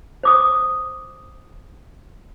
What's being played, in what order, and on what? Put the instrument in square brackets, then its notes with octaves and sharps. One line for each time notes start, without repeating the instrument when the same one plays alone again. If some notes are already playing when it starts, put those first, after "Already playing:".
[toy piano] C5 D6 D#6